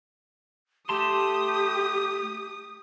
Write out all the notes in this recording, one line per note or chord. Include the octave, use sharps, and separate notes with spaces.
A3 G4 A5 C6 D#6